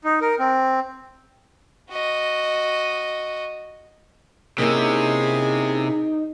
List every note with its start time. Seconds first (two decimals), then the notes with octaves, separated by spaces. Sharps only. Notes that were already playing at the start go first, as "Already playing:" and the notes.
0.04 D#4
0.21 A#4
0.39 C4
1.90 F#4 D#5
4.58 C3 A#3 C#4 D#4 E4 G#4